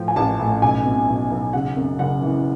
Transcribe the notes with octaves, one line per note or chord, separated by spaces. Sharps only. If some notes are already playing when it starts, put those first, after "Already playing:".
Already playing: A2 F3 G5
G#5
A1 A5
A2
B1 G#5
B2
B1
B1
C#3 F#5
F#2
F#1 F#5
E3